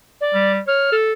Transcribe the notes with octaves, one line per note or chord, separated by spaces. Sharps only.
D5
G3
C#5 F6
A4